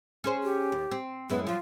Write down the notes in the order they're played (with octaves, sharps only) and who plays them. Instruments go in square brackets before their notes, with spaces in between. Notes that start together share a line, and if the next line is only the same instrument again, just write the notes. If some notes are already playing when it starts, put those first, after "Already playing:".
[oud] C#4 G#4 C5
[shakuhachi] G4
[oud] D#2
C4
[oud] F#2 G#3 E4 [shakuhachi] B3
[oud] F3 F#3 [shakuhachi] F4